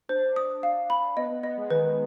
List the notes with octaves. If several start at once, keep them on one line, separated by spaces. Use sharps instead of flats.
D4 C5
D#6
F5
B5
B3 D#5
B3
B3 D#5
G#3
D#3 B4